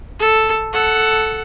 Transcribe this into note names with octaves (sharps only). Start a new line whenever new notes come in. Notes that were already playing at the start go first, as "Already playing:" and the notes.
A4
A4 F#5